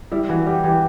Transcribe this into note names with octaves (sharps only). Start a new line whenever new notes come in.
G3 E4
E3 F#4
G3 G4
E3 G4